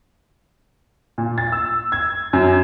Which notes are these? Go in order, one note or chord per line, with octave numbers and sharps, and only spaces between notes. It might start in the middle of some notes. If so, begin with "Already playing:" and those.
A#2
A6
E6
G#6
F#2